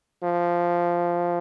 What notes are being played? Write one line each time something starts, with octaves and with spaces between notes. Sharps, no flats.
F3